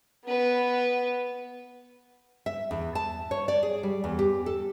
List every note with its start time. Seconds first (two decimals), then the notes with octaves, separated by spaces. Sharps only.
0.25 B3 B4
2.46 E5
2.71 E2
2.95 A5
3.31 C#5
3.48 D5
3.63 G#4
3.83 G3
4.04 E2
4.19 G4
4.46 A4